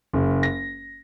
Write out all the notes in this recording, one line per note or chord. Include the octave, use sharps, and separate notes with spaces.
F#1
A#6